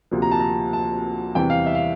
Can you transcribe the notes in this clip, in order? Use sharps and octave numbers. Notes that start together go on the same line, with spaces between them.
D2 C3 F3 A#3
A#5
A5
A#5
A5
E2 C3 E3 G3 G5
F5
E5
F5